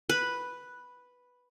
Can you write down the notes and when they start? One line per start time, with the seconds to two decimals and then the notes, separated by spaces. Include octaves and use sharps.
0.09 B4